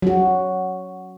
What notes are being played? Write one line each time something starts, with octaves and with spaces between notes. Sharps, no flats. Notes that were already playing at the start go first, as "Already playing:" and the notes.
F#3 F#4